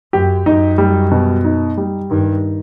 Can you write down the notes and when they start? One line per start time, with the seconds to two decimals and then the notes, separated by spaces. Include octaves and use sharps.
0.13 F#2 G4
0.46 F#2 D#4
0.78 G3
1.11 B2
1.45 D#4
1.77 G3
2.10 G2 D#3